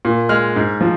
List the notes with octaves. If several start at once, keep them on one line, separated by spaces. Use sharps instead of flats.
A#2
G#3 F6
G#2
F3